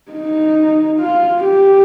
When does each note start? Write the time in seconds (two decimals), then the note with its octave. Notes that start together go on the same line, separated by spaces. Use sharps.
0.12 D#4
1.00 F4
1.44 G4